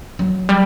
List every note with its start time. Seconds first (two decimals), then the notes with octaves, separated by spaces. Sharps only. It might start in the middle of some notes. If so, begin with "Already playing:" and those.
0.19 F#3
0.49 G3